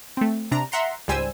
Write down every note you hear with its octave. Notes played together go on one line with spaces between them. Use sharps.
A3 C4
C3 D4 A#5
E5 F#5 A#5 C6
C#2 G#2 G3 C5 G#5 E6